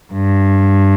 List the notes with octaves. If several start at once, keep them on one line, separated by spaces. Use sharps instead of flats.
G2